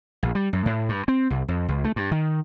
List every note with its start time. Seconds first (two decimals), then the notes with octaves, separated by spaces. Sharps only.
0.23 A#1
0.35 G3
0.53 F#2
0.66 A2
0.89 G2
1.08 C4
1.30 C2
1.48 F2
1.68 C#2
1.84 A3
1.96 G2
2.11 D#3